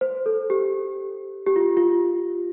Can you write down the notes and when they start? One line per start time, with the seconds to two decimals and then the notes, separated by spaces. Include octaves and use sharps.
0.01 C5
0.26 A4
0.50 G4
1.47 G4
1.56 F4
1.77 F4